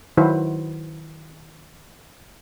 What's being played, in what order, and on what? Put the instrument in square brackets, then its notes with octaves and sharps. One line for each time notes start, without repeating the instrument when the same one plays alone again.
[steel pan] D#3 F#3 E4 F#4 B4 C5